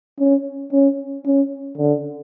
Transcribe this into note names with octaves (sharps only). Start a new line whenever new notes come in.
C#4
C#4
C#4
D3